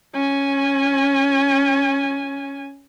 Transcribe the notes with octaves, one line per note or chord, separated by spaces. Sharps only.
C#4 G#5